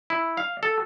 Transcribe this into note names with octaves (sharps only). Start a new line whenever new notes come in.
E4
F5
A4